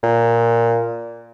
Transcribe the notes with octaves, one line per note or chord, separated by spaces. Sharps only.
A#2